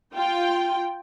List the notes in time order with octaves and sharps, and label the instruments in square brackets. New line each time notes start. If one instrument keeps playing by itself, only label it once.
[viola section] F4 G5